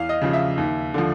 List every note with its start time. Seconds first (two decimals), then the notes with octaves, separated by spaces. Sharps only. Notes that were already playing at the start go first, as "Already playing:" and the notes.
Already playing: E2 F5
0.09 D#5
0.22 C#3 F3
0.33 E5
0.57 D#2
0.94 D3 F3